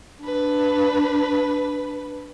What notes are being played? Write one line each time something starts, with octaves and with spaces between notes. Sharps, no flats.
D4 B4